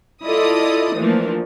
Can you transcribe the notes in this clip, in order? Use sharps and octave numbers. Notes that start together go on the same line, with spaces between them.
E4 F4 A4 D5 D#5 D#6
E3 F3 A3 A#3 D4